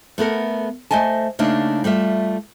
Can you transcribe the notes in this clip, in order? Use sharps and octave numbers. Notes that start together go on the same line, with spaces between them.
A3 B3 A4 A#4
A3 C5 D#5 G#5 A5
C#3 A3 A#3 D4 D#4
G3 A3 F4 E5